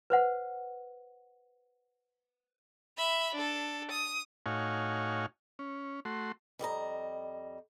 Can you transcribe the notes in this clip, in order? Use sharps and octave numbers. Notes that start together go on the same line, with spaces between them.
B4 C5 F#5
E5 B5
D4 A4
D#6
A2 D#4 F#4 C#5 F5 G#5
C#4
A3 F#4 C6
F2 G3 D#5 A#5